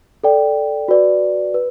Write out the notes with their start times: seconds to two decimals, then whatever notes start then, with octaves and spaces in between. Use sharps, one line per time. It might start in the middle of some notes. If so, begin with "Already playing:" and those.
0.24 A4 D5 G5
0.88 F#4 B4 D5
1.54 B4